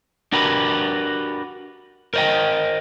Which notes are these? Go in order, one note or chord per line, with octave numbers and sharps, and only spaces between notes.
D4 F#4 G4 A#4 B4
A#4 C5 D5 D#5 G5